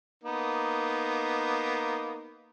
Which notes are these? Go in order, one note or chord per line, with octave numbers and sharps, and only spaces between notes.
A#3 B3 D#4